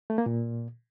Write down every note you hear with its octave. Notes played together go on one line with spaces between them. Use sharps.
A3
A#3
A#2